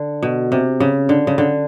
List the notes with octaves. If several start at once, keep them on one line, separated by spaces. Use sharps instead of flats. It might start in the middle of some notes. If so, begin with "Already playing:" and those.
Already playing: D3
B2
C3
C#3
D3
C#3
D3